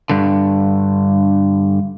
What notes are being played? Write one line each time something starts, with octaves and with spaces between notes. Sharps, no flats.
G2 D3